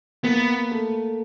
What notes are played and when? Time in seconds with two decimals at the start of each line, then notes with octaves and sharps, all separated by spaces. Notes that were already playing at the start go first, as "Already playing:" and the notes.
0.24 A#3 B3
0.71 A3